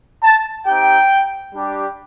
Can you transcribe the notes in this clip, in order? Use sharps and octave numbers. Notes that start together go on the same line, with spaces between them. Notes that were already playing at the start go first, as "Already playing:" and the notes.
A5
C4 D#4 G4 G5
G3 D4 G4